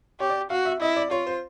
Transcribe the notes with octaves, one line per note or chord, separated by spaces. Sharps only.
G4 C#5
D5
F#4 F5
E5
E4 D#5
D5
F4 C#5
C5